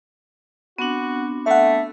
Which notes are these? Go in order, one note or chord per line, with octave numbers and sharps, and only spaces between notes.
B3 C4 D4 F#4
A3 E5 F#5